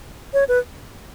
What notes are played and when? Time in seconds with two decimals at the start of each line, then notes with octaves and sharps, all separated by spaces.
0.34 C#5
0.48 B4